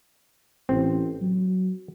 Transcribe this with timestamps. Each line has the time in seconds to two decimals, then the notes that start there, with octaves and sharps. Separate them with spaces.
0.69 A1 C4
1.22 F#3